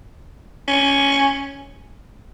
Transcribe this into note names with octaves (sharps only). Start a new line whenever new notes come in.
C#4